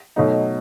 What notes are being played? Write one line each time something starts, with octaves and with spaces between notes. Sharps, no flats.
B2 F#3 A3 D#4